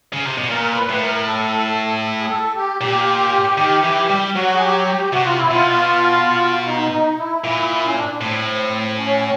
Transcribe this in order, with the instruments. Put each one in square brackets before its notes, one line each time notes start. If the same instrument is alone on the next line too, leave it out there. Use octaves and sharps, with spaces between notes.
[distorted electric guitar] C#3
C3
B2
[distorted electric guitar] A#2 [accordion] A#4
[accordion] B4
[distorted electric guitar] A2
[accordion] A#4
A4
G#4
A4
G4
[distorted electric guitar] A#2 [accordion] G4
[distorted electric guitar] D#3
E3
G3
[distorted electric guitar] F#3 [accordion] F#4
[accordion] G#4
G4
G4
[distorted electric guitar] C3 [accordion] F#4
[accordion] F4
E4
[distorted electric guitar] B2 [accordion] F4
[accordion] D#4
D#4
E4
[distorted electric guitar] A#2 [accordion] E4
[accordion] E4
C#4
D4
[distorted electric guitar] A2 [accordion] C4
[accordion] C#4